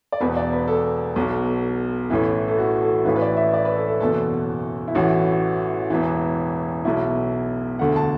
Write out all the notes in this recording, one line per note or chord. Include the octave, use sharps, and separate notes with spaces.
D5
E1 E2 B2 B4
D5
B4
A4
B1 B2
A1 A2 E3
A4
F#4
A4
A1 A2 E3 B4
B4
D5
E5
D5
B4
A4
A4
F#1 E2 B2 A4
E4
A1 A2 E3 F#4
E1 E2 E3
B1 B2 E4
E1 D2 D3 F#5
A5